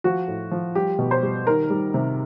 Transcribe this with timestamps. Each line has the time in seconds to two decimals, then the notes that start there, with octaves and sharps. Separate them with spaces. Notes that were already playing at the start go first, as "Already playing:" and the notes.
0.04 F3 F#4
0.28 A2
0.51 F3
0.75 G3 G4
0.99 B2
1.11 C5
1.23 G3
1.47 D#3 A#4
1.70 G3
1.94 C3